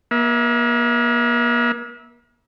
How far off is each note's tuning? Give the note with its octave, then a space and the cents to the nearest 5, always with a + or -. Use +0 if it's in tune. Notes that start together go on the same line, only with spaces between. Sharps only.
A#3 +40 E5 -15